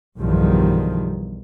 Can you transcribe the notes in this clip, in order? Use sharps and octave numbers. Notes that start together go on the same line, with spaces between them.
B1 E2 G2 D#3 F3 G3